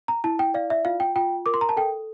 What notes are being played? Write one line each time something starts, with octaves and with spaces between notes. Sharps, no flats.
A#5
E4 A5
G5
D5 F5
E5
F4 F5
G5
F4 G5
A#4 D6
C6
A#5
A5
A4 G5